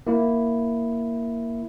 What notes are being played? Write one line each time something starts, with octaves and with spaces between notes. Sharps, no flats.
A#3 E4